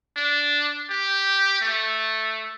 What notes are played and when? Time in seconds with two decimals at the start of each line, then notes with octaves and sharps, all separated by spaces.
0.16 D4
0.90 G4
1.61 A3